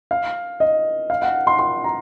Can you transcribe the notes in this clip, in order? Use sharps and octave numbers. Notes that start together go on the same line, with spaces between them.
F5
D#5
F5
F#5
C6
C6
A#5